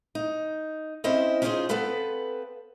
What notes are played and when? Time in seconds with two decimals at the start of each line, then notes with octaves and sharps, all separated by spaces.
0.15 D#4
1.04 C4 C#4 E4 C5 D#5
1.42 C#4 D#4 F4 G#4 C5 D#5
1.69 B3 C4 A4 B4 F5